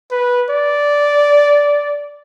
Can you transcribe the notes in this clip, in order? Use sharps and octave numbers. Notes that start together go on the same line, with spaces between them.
B4
D5